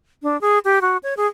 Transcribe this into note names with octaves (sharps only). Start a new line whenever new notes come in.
D4
G#4
G4
F#4
C#5
G#4